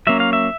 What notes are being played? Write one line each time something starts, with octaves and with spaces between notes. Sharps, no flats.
F#3 A#3 C#4 E5
F5
E5